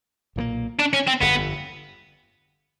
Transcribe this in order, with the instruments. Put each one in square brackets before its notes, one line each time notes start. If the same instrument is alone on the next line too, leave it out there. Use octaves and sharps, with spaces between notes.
[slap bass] B1 A#2 F3 A#3
[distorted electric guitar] D4
C#4
C4
[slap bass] G1 F2 D3 [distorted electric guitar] B3